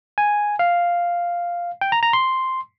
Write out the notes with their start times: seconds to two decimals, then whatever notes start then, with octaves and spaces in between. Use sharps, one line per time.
0.18 G#5
0.59 F5
1.81 G5
1.92 A#5
2.03 A#5
2.13 C6